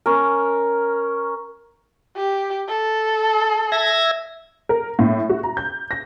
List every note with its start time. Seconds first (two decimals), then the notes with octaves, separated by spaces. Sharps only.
0.06 C#4 A#4
2.16 G4
2.68 A4
3.72 E5 G#6 A#6
4.69 A#4
4.99 A2
5.29 F#4
5.43 A#5
5.57 G6
5.91 A#6